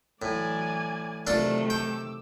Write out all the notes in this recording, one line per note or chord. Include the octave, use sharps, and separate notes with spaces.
A2 E3 F#3 A3 D5 G#5
C3 D#3 F#3 A3 D4 F4 A4
G5 D6 E6